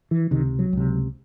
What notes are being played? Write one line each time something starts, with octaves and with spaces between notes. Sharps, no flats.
E3
C#2 C3 D#3
F#3
C#2 C3